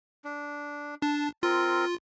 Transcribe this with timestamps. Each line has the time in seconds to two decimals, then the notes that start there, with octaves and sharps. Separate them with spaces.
0.24 D4
1.02 D4 A5
1.43 C4 F4 A#4